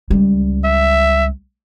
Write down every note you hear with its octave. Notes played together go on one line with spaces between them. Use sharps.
C#2 G3
E5